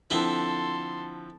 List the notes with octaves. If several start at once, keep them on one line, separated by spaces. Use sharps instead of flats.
D3 F3 C4 E4 A4 B4 C6 G7